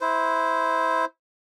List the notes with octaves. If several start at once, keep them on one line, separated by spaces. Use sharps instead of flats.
E4 C5